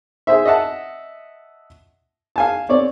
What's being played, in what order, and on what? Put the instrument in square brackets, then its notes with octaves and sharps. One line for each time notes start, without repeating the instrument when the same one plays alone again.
[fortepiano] G#4 C5 E5
D#5 E5 F#5 A5
F5 G#5 A5
C4 C#5 D5